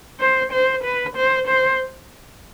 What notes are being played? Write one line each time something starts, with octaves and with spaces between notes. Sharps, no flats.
C5
C5
B4
C5
C5